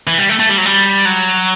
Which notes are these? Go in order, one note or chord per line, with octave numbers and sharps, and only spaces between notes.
E3
G3
A3
A3
G3
F#3
G3
F#3